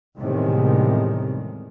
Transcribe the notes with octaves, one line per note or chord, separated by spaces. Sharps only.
E2 A2 C3 D#3 G3 G#3